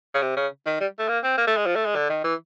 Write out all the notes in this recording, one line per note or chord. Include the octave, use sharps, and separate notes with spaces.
C#3
C3
C#3
D#3
G3
A3
A#3
C4
A#3
A3
G#3
F3
A3
G#3
D3
D#3
E3